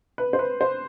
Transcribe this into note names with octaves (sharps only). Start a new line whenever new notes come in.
B4
C5
B4
C5